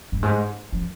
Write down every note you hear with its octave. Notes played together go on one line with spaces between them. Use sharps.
G2
G#2
F3